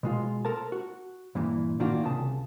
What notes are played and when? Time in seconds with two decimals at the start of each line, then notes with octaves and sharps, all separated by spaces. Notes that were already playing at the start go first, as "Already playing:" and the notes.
0.03 B2 G#3 F4
0.45 A4 A#4 C5 A5
0.72 F#4
1.35 G2 A#2 E3
1.80 A2 D#3 A#3 D4 F4 F#4
2.04 C2 C#3 A5